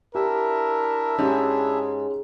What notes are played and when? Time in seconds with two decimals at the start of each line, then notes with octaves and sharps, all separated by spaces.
0.15 D4 E4 G4 A#4 E5
1.19 G#2 C#4 G4 G#4